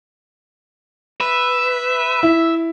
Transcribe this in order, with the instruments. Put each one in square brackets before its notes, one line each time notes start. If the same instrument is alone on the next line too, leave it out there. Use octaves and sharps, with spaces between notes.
[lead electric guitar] B4 [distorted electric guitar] E5
[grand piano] E4